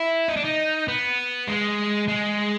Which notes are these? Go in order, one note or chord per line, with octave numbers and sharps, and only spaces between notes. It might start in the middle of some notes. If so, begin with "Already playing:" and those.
Already playing: E4
D#4
D4
D#4
B3
G#3
G#3